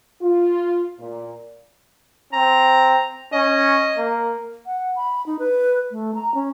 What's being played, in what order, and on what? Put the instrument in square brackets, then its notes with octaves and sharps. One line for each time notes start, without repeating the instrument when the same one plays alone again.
[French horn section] F4
A#2
[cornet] C4 [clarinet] A#5
[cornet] C#4 [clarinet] D#5
[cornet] A#3
[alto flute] F#5
B5
D#4
B4
A3
A#5
C#4